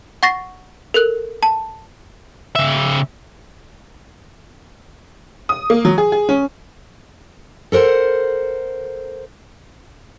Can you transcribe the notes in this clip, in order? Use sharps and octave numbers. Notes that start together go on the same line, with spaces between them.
F#5 C#6 A6 A#6 C7
A4 A#4 F#6
A5
C#3 E5
D#6
A#3
F#3
G#4
G#4
C#4
A4 A#4 C5 F#5